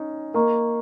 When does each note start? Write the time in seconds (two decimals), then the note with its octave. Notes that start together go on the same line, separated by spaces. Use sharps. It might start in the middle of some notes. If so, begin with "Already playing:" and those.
Already playing: C#4 D#4
0.34 A#3 A#4 D#5 A#5 C#6